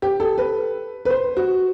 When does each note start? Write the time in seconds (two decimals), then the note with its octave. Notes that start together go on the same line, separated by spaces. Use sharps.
0.02 G4
0.20 A4
0.38 B4
1.05 B4
1.10 C5
1.37 F#4